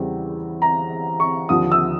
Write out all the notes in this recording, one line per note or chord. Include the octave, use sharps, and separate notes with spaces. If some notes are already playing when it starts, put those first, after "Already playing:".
Already playing: E2 C#3 E3 G3 C4
A#5
C#6
D#2 D3 F3 D#6
E6